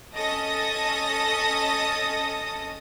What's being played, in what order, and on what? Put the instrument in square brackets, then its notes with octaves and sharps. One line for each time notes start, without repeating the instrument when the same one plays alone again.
[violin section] C#4 A4 D#5 A5 D#6 A#6